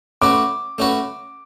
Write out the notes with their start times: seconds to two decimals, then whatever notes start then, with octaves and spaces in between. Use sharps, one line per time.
0.22 A3 C#4 F#4 B4 D6
0.78 A3 C#4 F#4 B4